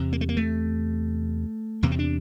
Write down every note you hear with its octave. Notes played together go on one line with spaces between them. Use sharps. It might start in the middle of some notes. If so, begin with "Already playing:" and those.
Already playing: E2 C3
A#3
A3
A#3
A3
E2 C3 A#3
C4
D4